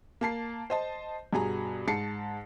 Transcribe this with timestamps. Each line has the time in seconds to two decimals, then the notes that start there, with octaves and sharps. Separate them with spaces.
0.21 A#3 A5 C7
0.70 C5 D#5 A5
1.33 G2 B2 G#4 G#5 A#5
1.88 G#2 A5 C7 C#7